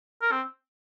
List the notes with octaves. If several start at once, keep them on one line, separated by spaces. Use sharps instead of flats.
A#4
C4